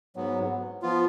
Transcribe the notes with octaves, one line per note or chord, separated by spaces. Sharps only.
G#2 F#3 B3
F3 B3 F4